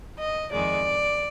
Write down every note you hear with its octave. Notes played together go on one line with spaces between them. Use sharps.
D#5
F2 D#3 G#3 D5